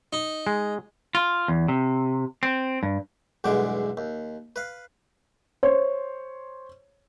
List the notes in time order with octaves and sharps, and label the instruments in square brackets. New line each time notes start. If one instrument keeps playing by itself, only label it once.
[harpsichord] D#4
[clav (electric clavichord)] G#3
[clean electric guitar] F4
E2
C3
C4
G2
[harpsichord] B1 E2 G2 D3 G#3 D6
D#2
B4 F5
[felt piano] C5 C#5